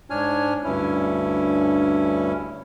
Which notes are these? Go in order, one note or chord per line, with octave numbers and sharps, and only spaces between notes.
G#2 D4 C#5 G#5 F6
D2 G2 C#4 E4